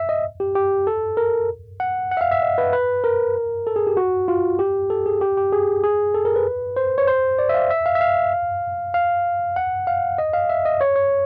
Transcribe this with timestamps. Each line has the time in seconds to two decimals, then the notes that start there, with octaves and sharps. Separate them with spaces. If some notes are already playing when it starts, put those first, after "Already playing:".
Already playing: E5
0.09 D#5
0.40 G4
0.55 G4
0.87 A4
1.17 A#4
1.80 F#5
2.11 F#5
2.17 E5
2.21 F5
2.31 E5
2.42 D#5
2.58 B4
2.73 B4
3.04 A#4
3.67 A4
3.76 G#4
3.87 G4
3.97 F#4
4.28 F4
4.59 G4
4.90 A4
5.06 G#4
5.21 G4
5.37 G4
5.52 G#4
5.84 G#4
6.14 A4
6.25 A#4
6.36 B4
6.76 C5
6.98 C#5
7.07 C5
7.39 D5
7.49 E5
7.54 F5
7.70 E5
7.86 F5
7.95 E5
8.01 F5
8.94 F5
9.56 F#5
9.87 F5
10.18 D#5
10.33 F5
10.49 E5
10.65 D#5
10.81 C#5
10.96 C#5